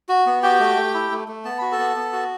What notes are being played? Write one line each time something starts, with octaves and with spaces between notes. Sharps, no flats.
F#4
B3
F#4 G4 G5
A3
A3
E4
A3
A3
B3 A5
F#4 B5
A4 A5
B3
B3
F#4